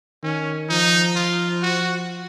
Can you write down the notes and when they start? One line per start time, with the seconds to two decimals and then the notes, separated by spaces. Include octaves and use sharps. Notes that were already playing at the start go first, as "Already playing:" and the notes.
0.23 D#3 C#4
0.70 F3 D#4
1.16 F4
1.63 F#4